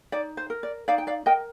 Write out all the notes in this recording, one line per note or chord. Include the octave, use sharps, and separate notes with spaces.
D#4 D5
C5
A#4
D5
D#4 D5 F5
G5
D5 F5
A#4 D#5 G5